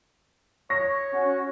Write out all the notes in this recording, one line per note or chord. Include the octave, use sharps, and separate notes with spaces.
C#5 C#6 A#6
C#4 F#4